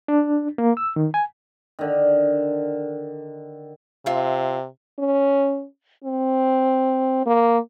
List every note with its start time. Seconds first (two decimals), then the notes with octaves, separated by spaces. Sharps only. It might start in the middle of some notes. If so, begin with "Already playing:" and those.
0.08 D4
0.58 A#3
0.77 E6
0.96 D#3
1.14 G#5
1.79 D3 D#3
4.06 C3 F4 E5
4.99 C#4
6.04 C4
7.26 A#3